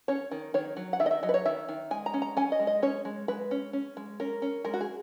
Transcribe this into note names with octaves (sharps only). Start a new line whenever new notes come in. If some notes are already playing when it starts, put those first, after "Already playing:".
C#4 C#5
D#3
D#3 C#5
F#3
F#5
D#3 E5
D#5
E5
F#3 D#5
B4
C#5
D#3 E5
D#3
G#3 G#5
A#5
C#4
A#5
C#4 G#5
D#5
G#3
D#5
C#4 C#5
G#3
G#3 B4
C#4
C#4
G#3
C#4 A#4
C#4
G#3 A#4
F#4
G#4